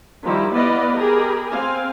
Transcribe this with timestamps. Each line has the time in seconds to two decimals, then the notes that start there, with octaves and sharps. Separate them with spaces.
0.23 D#3 F3 G3 E4
0.53 B3 E4 B4 D5 D#5 F5
0.96 G4 G#4 A#4 B5
1.49 C4 F5 G#5